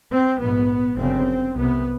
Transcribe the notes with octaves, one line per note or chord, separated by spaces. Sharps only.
C4
A#1 G#2 B3
G1 F#2 C#3 C4
C2 C3 B3